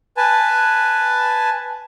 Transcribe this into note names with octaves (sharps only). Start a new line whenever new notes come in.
B4 G#5 A5